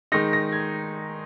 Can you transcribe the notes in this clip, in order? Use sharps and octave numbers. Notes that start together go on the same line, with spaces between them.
D#3 G#3 D#4 A#6
A#6
G#6